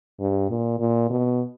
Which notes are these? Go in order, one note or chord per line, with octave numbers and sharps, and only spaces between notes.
G2
A#2
A#2
B2